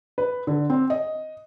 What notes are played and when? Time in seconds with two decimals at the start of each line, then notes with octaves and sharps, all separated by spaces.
0.18 B4
0.47 D3
0.70 C4
0.90 D#5